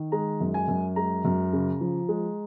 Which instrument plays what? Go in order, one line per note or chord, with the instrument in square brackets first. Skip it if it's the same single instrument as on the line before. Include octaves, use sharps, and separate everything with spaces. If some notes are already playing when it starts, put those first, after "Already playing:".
Already playing: [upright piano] D#3
G#3 A#5
F#2
G#5
F#2
G#3 A#5
F#2
C#3
F3
G#3